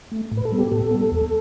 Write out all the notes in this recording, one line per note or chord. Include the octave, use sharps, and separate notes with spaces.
A3
A2
B4
A4
G3 B3
G4
A2 A4
G3 B3
E2